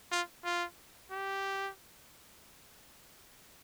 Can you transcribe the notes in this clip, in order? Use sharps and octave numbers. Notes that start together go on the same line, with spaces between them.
F4
F4
G4